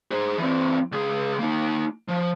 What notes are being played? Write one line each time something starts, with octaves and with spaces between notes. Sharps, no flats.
G#4 C5
E3 C4
C#2 G#4
A#3 D#4
F3